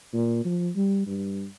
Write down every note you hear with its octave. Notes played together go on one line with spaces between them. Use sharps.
A#2
F3
G3
G2